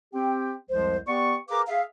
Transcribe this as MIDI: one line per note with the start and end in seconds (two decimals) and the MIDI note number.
0.14 0.53 60
0.14 0.53 67
0.14 0.53 79
0.70 0.97 36
0.70 0.97 41
0.70 0.97 53
0.70 0.97 56
0.70 0.97 72
1.08 1.35 59
1.08 1.35 67
1.08 1.35 74
1.08 1.35 85
1.49 1.62 68
1.49 1.62 70
1.49 1.62 71
1.49 1.62 77
1.49 1.62 82
1.49 1.62 86
1.68 1.83 68
1.68 1.83 76
1.68 1.83 77